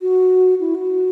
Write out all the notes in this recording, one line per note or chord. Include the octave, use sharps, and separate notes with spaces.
F#4
E4
F#4